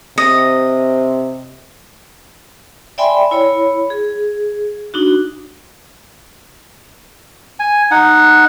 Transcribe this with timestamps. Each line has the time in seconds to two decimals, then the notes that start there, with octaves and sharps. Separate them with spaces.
0.18 C3 D#5
2.98 D5 E5 G5 G#5 B5 C6
3.31 E4 C#5 B5
3.90 G#4
4.94 D4 D#4 F#4
7.60 G#5
7.91 D#4 F#5